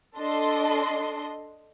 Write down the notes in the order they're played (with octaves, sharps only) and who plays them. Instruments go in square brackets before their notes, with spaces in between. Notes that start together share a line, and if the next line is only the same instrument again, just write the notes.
[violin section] D4 A4 D#5 C6